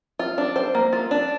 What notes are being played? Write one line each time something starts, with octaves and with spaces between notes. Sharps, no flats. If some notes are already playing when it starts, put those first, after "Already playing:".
F4
D4
C5
A#3
F4
D4